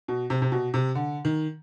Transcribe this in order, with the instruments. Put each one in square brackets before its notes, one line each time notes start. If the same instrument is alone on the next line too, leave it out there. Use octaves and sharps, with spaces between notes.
[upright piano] B2
C3
C3
B2
C3
D3
D#3